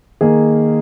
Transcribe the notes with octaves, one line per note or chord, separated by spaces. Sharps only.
D#3 A#3 G#4